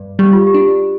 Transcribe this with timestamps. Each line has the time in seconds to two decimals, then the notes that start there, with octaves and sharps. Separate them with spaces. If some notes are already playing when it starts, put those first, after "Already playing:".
Already playing: G2
0.19 G3 G4
0.33 F4
0.47 G4
0.54 D4